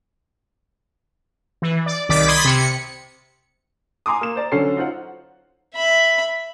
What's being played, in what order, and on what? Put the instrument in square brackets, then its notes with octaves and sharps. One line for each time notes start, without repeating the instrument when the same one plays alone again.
[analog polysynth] E3
D5
C2 D#3 D5 D6 B6
B5 C6 D#6 G#6 A6 B6
C3 C#7
[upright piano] G#5 A#5 C6 D6 D#6
A#3 E7
C5 D5 A#5
D3 F#3 C#4 A4 C7
D#4 F4 C5 F#5
[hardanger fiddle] E5 B5